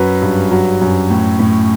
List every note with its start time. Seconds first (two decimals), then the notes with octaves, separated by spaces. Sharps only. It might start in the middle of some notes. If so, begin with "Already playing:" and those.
Already playing: F#2 F#3 B4
0.22 G2
0.51 F#3
0.81 F#2
1.10 A2
1.39 A2